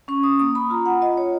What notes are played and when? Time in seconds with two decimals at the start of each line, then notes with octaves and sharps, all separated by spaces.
0.08 C#4 C#6
0.24 D#6
0.40 A#3 D#6
0.55 B5
0.70 F4 A#5
0.86 F#5
1.02 F4 D#5
1.18 C#5